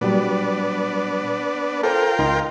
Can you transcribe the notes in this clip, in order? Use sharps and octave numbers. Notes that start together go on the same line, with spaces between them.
A#2 F#3 G3 B3 D4
F4 A4 A#4 C5 G5
C#2 D#4 C6